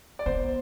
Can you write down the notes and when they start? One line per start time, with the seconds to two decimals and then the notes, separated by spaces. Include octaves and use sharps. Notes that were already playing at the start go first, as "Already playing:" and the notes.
0.19 D5
0.26 B3 C5